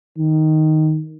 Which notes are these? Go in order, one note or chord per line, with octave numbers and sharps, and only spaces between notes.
D#3